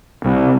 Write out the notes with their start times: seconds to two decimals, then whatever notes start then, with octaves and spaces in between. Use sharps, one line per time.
0.24 C2